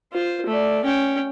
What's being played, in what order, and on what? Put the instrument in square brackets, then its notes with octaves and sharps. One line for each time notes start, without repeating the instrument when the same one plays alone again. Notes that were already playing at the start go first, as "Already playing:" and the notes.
[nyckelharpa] F4 C5
A3 D5
C#4 G5